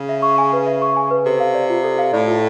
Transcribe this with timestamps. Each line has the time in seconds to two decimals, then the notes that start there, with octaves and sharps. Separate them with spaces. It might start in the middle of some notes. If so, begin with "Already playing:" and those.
Already playing: C#3
0.09 E5
0.22 C#6
0.38 G#5
0.53 B4
0.67 E5
0.82 C#6
0.96 G#5
1.11 B4
1.25 C3 A4
1.40 F5
1.54 D5
1.70 F4
1.84 A4
1.98 F5
2.13 A2 D5
2.28 F4